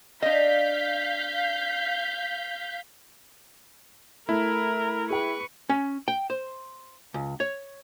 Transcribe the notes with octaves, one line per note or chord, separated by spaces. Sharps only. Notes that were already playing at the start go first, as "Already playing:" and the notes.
D4 D#5 F5 G6 B6
A3 E4 A#4
G#4 B4 G5 C#6
C#4
G5
C5
C#2
C#5